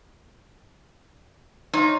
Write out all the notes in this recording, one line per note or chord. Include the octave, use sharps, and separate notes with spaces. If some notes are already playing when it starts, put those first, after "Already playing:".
D#4 F4 C#5